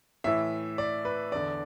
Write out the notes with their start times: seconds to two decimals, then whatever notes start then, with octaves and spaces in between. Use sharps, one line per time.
0.24 A2 E3 E5
0.78 D5
1.05 B4
1.32 E2 D3 D5